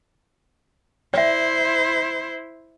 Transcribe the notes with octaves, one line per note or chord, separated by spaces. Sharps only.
E4 C5 D5 E5